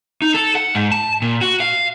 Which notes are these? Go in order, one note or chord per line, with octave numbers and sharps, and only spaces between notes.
D#4
A4
F#5
G#2
A5
A#2
F#4
F5